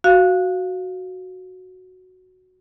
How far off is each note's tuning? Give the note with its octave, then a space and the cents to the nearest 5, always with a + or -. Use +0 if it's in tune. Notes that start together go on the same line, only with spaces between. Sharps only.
F#4 +0 F5 +0